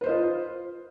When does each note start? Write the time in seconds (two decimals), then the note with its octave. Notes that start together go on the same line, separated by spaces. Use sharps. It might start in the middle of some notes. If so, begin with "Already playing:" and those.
0.01 B4
0.04 C5
0.06 D#5
0.09 F4